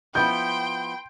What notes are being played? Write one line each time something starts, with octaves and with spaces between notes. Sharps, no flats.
F3 B3 E4 G5 C6 G6